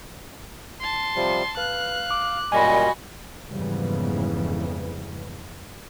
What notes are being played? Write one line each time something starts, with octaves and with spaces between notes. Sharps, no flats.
A5 C6
C3 F3 G3
B4 F5 F#6
D6
F#2 A#2 G3 F#4 D#5 G#5 B5
F2 G#2 C#3 E3 G3 B3